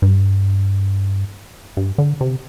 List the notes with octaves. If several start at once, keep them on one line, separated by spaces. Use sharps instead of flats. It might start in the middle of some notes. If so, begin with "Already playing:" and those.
G2
G2
D3
C3